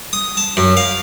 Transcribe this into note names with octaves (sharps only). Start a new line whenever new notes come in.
D#6
A5
F#2
F5